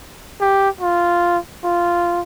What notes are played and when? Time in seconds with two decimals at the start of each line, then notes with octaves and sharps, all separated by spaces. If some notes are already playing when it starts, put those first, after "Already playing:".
0.40 G4
0.81 F4
1.64 F4